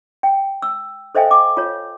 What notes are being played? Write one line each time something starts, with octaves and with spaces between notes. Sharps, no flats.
G5
E6
A4 C5 D#5 F5 G5 G#5
D6
F4 C#5